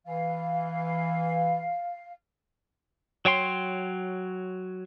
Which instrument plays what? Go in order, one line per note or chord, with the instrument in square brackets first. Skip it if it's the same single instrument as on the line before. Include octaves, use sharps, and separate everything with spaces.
[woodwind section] E3 [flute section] F5
[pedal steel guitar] F#3 C#5 G5 C6